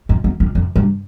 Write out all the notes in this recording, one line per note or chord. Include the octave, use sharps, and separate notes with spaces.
F2
E2
F2
F2
G2